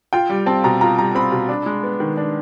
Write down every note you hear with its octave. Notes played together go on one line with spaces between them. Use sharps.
F4 G5
G3
C4 A5
B2 A#5
F4 A#5
G3 A#5
C4 B5
B2
D4
G#3
B3
D#3
D4